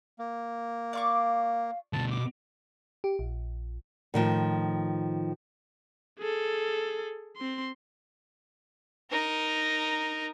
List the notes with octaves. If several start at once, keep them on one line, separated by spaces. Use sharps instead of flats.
A#3
D5 F5 C#6 D6
D2 B2 A5
D6
G4
A#1
A2 D#3 F3
G#4 A4
C4 C6
D#4 A#4